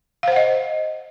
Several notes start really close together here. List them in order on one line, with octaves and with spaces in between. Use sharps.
F5 C5 F#5 D#5